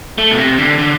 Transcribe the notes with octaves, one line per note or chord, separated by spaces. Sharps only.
A3
B2
C3
D3
D3